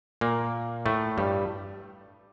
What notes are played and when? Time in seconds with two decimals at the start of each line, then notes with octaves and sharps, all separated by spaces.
0.21 A#2 A#3
0.86 A2 A3
1.18 G2 G3